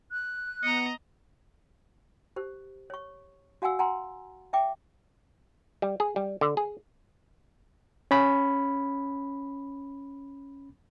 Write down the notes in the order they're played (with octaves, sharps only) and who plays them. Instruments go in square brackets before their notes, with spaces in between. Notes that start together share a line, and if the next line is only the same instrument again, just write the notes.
[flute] F#6
[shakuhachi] B3 [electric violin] D#5 A#5 [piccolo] C#7
[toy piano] G4 C5
C#5 C#6
F#4 F5 F#5 G#5 E6
F#5 G#5 A#5 C6
E5 G5 D6
[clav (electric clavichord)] G3
G#4
G3
D3
G#4
[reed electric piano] C#4 B5